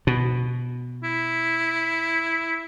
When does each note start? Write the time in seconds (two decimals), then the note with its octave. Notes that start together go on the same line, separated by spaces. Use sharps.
0.07 B2
1.03 E4